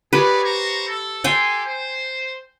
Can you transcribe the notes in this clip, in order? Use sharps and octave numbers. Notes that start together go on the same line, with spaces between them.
G4 G#4 B4 C#5 D5
C5 A#5 C#6
A4
G4 A4 G5 G#5 C6
C5